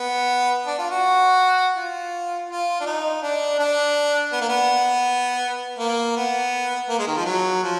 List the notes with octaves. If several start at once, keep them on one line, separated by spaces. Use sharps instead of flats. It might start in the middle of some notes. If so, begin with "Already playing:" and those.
Already playing: B3
D4
F4
F#4
F4
F4
D4
D#4
D4
D4
B3
A#3
B3
A#3
B3
A#3
G#3
D#3
F3
F#3
F3